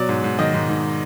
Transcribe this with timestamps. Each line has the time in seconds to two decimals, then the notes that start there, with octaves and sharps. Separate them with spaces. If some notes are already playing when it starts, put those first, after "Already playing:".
Already playing: B2 F#3 D5
0.09 G#2
0.24 G#2
0.39 D#3 D#5
0.54 G#2
0.69 G#2